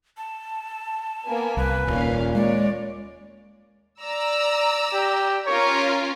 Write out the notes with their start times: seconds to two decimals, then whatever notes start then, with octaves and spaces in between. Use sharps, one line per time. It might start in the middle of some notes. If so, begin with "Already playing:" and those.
0.17 A5
1.27 A#3 B3 G#5
1.57 C2 B4
1.87 D#1 A#2 C#4 F5
2.35 G#3 C#5 D5
4.02 D5 A#5 E6
4.93 G4
5.47 C#4 F4 A#4 C#5